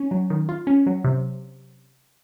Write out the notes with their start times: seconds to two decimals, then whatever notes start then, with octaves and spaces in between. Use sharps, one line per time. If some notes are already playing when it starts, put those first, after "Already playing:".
Already playing: C#4
0.11 F#3
0.30 D#3
0.49 F4
0.67 C#4
0.86 F#3
1.04 C3